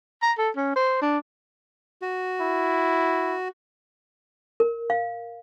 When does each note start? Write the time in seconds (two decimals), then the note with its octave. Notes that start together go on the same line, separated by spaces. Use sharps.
0.22 A#5
0.38 A4
0.56 C#4
0.76 C5
1.01 D4
2.02 F#4
2.41 E4
4.60 A#4
4.90 F5